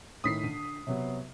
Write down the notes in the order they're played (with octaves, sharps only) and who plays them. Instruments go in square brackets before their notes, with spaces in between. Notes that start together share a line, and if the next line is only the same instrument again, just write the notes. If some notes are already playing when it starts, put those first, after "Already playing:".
[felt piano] A2 D#3 [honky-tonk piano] D#6 B6 C7
[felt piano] D3 D#7
C3 F#3 B3